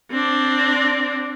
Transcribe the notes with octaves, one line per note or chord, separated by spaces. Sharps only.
C4 D4